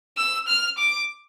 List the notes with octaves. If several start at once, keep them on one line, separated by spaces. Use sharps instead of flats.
E6
F6
D6